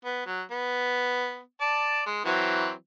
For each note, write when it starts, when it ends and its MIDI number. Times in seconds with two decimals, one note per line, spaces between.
0.05 0.23 59
0.26 0.42 54
0.51 1.39 59
1.61 2.02 74
1.61 2.02 81
2.06 2.24 56
2.25 2.71 52
2.25 2.71 54
2.25 2.71 60